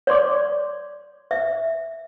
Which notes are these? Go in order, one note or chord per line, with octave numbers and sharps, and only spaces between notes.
C#5 D5 C6 D6
E5